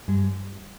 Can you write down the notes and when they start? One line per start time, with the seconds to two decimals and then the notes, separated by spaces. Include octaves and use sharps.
0.08 G2 G3